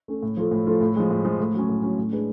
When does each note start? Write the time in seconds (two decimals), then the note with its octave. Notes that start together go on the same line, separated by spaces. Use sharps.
0.08 A3 C#4
0.22 A2
0.37 F3 A3 F4 A4
0.51 A2
0.66 F3 A3 F4 A4
0.81 A2
0.96 F3 G#3
1.11 A2
1.25 F3 G#3
1.40 A2
1.54 F#3 C#4
1.69 A2
1.83 F#3 C#4
1.98 A2
2.12 G#3 D4 G#4 B4